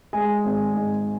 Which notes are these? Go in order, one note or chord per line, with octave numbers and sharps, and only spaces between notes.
G#3 G#5
G#1
G#2